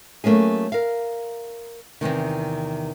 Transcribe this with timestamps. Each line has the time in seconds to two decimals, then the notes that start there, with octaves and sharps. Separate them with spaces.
0.24 F#3 A3 A#3 C#4 G#4
0.72 A#4 F5
2.01 E2 A2 C3 D#3